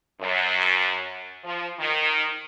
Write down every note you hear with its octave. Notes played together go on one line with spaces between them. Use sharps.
F#2
F3
D#3